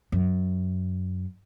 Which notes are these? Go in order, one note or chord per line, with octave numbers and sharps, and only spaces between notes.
F#2